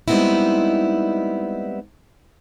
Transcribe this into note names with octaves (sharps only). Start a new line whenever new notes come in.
G3 G#3 B3 C4 D#4 E4